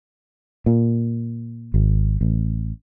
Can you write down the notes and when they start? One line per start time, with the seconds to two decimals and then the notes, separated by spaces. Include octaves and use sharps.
0.66 A#2
1.74 G#1
2.21 A1